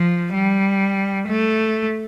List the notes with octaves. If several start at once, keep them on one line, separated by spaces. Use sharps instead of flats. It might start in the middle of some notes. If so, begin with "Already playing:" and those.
Already playing: F3
G3
A3